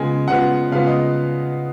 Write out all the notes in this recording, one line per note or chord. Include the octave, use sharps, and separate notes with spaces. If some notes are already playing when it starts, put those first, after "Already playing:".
Already playing: C#3 G#3 B3 F4 G#5
C#3 G#3 B3 F4 F#5
C#3 G#3 B3 F4 F5
D#5